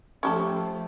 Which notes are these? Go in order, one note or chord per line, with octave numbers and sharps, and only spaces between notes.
F3 A3 C#4 G4 A4 C#6